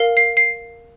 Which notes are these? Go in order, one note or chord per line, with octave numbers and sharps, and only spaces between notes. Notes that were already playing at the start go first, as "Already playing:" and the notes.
Already playing: A#4 F5
C7
C7